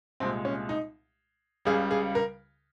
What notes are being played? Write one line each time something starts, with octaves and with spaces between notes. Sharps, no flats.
C2 A#2 G#3 C4
C#4
D#4
C#2 C#3 G3 G#4
G#4
A#4